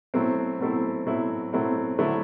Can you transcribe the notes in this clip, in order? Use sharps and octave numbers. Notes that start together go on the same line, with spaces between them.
B2 F#3 A3 C4 E4
B2 F#3 A3 C4 E4
B2 F#3 A3 C4 E4
B2 F#3 A3 C4 E4
D3 F#3 A3 E4